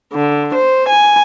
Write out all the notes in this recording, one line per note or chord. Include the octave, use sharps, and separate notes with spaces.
D3
C5
G#5